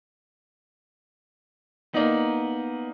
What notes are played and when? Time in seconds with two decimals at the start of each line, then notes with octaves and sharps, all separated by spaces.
1.94 A#3 B3 D#4 D5